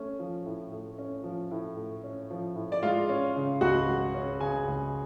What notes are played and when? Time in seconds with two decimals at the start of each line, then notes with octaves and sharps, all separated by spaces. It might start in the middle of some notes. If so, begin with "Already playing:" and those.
Already playing: A3 C#4
0.19 F3
0.46 A2
0.72 A3
0.98 C#4
1.24 F3
1.51 A2
1.76 A3
2.03 C#4
2.30 F3
2.55 A2
2.72 D5
2.83 G#3 F4 F5
3.09 C#4
3.36 C#3
3.61 C#2 F#4 F#5
3.88 G#3
4.14 C#4
4.41 C#3 G#4 G#5
4.68 C#2